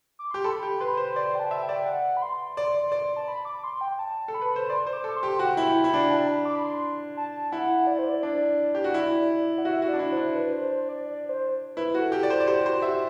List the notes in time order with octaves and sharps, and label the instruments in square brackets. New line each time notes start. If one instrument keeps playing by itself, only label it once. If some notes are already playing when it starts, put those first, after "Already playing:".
[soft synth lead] D6
[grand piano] G4 [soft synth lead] C6
[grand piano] A4 [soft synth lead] B5
[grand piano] G4
[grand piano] B4 [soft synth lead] C6
[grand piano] C5
[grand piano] D5 [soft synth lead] C6
[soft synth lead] G5
A5
[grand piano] E5 [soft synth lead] A5
[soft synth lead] G5
[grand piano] D5
[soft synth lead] F#5
B5
C6
[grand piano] D5
D5
[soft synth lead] A5
B5
D6
C6
G5
A5
[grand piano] A4
[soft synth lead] B5
[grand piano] B4
C5
[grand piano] D5 [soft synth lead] C6
[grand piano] C5 [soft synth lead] C6
[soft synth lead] D6
[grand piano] A4
[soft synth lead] C6
[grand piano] G4
[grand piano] F#4 [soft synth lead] G5
[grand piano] E4
[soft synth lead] G5
[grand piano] E4
D4
[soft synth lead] A5
B5
D6
B5
C6
A5
[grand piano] E4 [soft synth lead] F#5
[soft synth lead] D5
C5
D5
[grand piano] D4
G4
F#4
E4
[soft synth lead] F#5
[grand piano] F#4 [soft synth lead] E5
[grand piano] F#4
[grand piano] D4 [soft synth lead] D5
[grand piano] E4
[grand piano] D4 [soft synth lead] C5
[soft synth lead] B4
C5
C5
D5
D5
C5
[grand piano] E4 [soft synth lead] B4
[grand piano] F#4
[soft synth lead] A4
[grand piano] G4
D5
C5
D5
[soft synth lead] G4 [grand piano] C5
[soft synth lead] F#4 [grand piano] C5
[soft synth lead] G4 [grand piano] E5